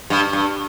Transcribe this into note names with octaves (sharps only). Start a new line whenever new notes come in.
G2
G2